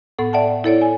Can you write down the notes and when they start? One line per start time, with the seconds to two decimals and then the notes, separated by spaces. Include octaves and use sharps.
0.19 A2 B3 A4 F#5
0.33 D5 E5 F#5 G5 A5
0.64 E4 A4 C#5 D5
0.82 G#5